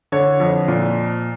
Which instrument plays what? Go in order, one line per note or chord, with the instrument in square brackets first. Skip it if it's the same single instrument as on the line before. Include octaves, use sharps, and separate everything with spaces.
[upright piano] D3 C#5
F2
A#2